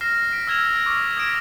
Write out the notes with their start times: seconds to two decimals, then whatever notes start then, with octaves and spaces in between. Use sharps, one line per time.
0.01 F6 A#6 C7 E7
0.31 B6 D7
0.47 E6 F6 G#6 E7 F7 G7
0.86 C#6 D6 E6 F6 F7
1.17 D#6 G#6 A#6 B6 D7 E7